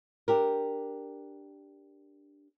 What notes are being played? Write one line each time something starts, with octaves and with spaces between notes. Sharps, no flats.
D4 G4 A#4